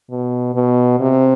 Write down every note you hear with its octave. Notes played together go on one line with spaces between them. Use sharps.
B2
B2
C3